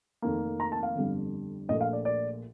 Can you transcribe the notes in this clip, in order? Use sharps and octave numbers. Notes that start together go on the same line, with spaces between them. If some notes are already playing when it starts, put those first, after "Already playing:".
F1 F2 D#3 A#3
A#5
A5
F5
G1 F2 D3 G3
A#1 A#2 A3 D#5
F5
D5
D5